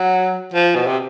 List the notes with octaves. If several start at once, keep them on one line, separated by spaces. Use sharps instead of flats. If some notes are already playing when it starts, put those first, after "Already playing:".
Already playing: F#3
F3
B2
C3